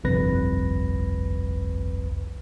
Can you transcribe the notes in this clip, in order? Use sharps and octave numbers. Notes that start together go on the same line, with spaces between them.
G1 C2 F2 B4 A#6